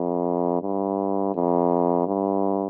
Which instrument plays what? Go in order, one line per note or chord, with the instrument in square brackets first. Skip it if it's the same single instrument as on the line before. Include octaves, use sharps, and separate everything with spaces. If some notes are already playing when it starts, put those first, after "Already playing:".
Already playing: [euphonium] F2
G2
F2
G2